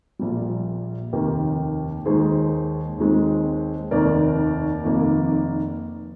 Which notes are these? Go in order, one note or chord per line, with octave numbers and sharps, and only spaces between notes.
A#1 A#2 G3
F1 D#2 D#3 G4 A#4
D#2 D#3 G#3 G#4 C5
D#2 D#3 G#3 C4
F1 D#2 D#3 A#4 D5
F1 F2 D#3 A#3